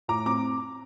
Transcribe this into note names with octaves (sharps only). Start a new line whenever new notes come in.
A2 A#5 D6
C4 A#5 D6